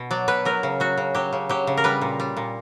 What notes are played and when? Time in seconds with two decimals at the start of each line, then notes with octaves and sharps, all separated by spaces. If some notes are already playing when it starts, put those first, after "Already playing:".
Already playing: B2
0.11 F#3 D5
0.28 B2 B4
0.45 F#3 A#4
0.63 C#3
0.80 F#3 F#4
0.98 C#3
1.15 F#3 G4
1.33 C#3
1.49 F#3 G4
1.67 C#3
1.77 A#4
1.84 G3 B4
2.01 A#2
2.20 G3
2.37 A#2